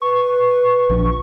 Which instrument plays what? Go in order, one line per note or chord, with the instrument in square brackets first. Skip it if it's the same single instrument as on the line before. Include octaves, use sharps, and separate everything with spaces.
[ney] B4 [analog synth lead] C#6
[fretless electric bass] A#1 F3 D4